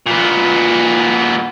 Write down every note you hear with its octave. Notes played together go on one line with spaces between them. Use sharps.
A#2 B3